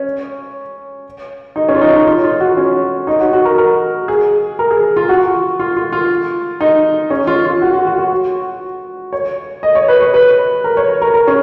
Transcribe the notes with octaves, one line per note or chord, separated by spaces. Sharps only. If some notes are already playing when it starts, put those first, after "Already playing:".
Already playing: C#4
D#4
C#4
F4
D#4
D#4
F4
F4
F#4
C#4
D#4
F#4
F#4
A#4
A#4
G#4
A#4
G#4
F4
F#4
F#4
F4
F4
F4
D#4
C#4
F4
F4
F#4
F#4
F#4
F#4
C#5
D#5
C#5
B4
C#5
B4
A#4
C#5
A#4
A#4
C#4